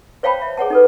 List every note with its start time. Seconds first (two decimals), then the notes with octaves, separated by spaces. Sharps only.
0.23 C5 C#5 F5 G5 A5 B5
0.42 E5
0.57 G#4 C#5 F#5 A5
0.70 D#4 A4 B4